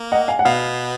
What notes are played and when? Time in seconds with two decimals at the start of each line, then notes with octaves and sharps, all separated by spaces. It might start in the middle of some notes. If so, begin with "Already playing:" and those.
Already playing: A#3
0.12 D#5 F#5
0.28 F5 G#5
0.39 F#5
0.45 B2 B3 F5